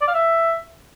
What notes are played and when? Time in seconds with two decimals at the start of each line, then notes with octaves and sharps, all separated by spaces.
0.01 D5
0.08 F5
0.14 E5